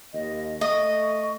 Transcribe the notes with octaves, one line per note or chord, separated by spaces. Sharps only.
D#2 D#5
A3 D#5 C#6